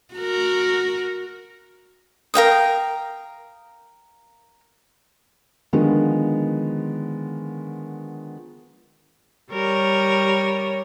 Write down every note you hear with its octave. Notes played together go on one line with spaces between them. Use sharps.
F#4 A#4
A#4 F5 G5 D#6
D3 D#3 F3 G#3 B3
G3 A#4 C#5